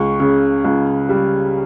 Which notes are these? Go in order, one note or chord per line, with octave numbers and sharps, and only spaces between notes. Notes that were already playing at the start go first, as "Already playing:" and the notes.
Already playing: C#2 C#6
C#3
C#2
G3